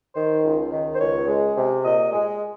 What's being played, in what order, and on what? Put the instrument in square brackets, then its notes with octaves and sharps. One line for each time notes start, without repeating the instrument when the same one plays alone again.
[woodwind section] D#3 C5
C#2
D#3
C5
C#2 C#5
G#3
C3
A#2 D#5
G#3